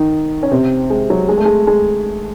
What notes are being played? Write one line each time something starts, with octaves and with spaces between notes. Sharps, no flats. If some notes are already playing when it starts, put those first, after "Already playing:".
Already playing: D#3 D#4
C#4
C3 C4
G#3
F#3
G#3
A3
G#3
G#3